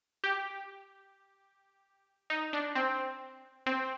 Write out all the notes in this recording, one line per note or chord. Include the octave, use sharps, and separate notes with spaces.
G4
D#4
D4
C4
C4